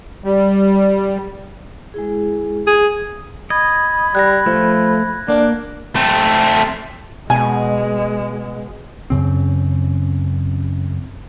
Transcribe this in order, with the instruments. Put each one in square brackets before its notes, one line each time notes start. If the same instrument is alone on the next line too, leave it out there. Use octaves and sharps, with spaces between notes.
[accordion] G3
[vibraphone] G#3 E4 G#4
[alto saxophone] G#4
[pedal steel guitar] D#5 [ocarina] B5 [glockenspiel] G#6
[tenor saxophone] G3 [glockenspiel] F#6 A#6
[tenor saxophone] F3 [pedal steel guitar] A3
[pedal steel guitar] A#3 [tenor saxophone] D4
[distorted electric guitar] A3 C4
[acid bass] B2 [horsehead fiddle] G#3 [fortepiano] G#5
[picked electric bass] F#2 C#3 C4